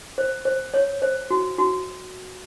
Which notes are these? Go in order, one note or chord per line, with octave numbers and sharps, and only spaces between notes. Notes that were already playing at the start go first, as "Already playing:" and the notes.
C5
C5
C#5
C5
F#4
F#4